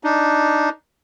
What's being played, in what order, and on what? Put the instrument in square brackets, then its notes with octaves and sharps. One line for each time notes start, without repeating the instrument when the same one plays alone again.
[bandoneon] D4 D#4